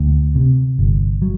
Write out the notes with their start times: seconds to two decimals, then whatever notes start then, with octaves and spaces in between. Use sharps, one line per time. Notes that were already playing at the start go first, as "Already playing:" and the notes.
Already playing: D2
0.35 C3
0.79 G1
1.22 F#3